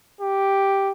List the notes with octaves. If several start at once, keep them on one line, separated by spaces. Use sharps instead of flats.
G4